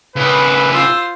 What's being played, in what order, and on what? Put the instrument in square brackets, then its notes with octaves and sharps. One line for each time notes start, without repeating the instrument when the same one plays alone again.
[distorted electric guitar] C#3 E4 [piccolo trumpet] B4
[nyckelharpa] F4 C5 [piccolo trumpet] E6